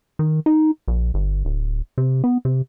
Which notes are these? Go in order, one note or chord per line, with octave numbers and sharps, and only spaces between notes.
D#3
D#4
A#1
G1
D1
C3
B3
C3